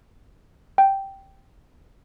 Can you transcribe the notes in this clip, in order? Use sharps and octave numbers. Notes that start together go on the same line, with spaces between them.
G5